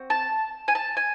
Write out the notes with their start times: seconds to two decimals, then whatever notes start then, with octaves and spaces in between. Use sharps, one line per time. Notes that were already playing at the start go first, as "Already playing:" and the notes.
Already playing: C4 F#4
0.10 A5
0.68 G#5
0.75 A5
0.97 G#5